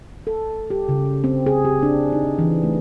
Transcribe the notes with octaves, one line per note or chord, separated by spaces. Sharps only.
A4
G4
C#3
C4
G#4
G4
D4
D#4
E3
A3